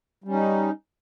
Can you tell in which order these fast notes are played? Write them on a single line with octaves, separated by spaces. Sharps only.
G3 C#4 D#4